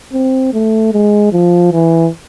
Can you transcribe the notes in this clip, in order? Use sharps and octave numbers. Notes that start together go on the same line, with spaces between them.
C4
A3
G#3
F3
E3